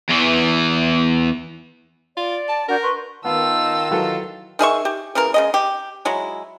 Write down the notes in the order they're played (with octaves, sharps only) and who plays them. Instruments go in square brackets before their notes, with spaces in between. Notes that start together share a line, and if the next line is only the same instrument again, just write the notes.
[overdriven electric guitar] E2 E3
[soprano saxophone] F4 [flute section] D5
[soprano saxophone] A5
[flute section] D4 F#4 G6 [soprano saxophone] A#4
[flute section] B4 C6 C#6
[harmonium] D#3 A5 [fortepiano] B3 [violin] D#4 E6 [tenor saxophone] F4
[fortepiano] E3 F#3 A4 [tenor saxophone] F4
[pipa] D#3 G#4 E5 C#6
G4
C#3 E3 A#3 A#4
C#3 G#3 D#5
G4
F#3 G#3 E4